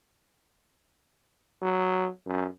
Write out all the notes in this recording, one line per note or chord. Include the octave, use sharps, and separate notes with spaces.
F#3
F#2